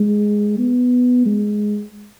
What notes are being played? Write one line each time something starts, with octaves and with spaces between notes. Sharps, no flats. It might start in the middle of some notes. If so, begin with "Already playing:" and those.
Already playing: G#3
B3
G#3